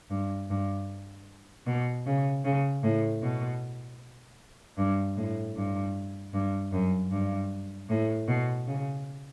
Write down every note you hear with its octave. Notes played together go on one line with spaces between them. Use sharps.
G2
G2
B2
C#3
C#3
A2
B2
G2
A2
G2
G2
F#2
G2
A2
B2
C#3